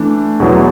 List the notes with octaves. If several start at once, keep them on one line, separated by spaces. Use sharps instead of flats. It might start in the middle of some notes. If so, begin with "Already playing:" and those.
Already playing: E3 A3 D4
E2 B2 F#3 B3 E4